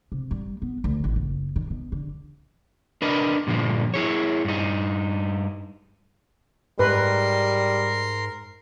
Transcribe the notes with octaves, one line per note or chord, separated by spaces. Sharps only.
C3
G3
B3
D2
A1
F#1
D#3
B2
D3
D4 A#4 B4 D#5
G2 A#2 D3 F3
E4 G#4 C#5
G2 D#4
G#2 G3 A#4 B4 C6